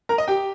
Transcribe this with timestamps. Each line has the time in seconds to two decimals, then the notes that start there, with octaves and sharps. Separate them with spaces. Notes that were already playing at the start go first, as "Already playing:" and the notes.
0.09 A#4 A#5
0.18 D#5
0.28 G4 G5